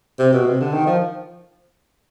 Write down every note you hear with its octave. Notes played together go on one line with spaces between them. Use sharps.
C3
B2
C3
D3
D#3
F3